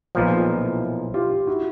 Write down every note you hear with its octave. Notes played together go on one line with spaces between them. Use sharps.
B1 A#2 F3 F4
F4
E4
F4 G4
E4 F#4